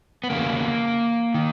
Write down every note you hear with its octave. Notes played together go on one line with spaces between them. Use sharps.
B3
E2 C#3 A#3
D#3